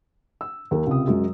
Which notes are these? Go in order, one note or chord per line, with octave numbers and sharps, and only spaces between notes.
E6
D#2 A#4
C#2 C3 D#6
F#2 G#3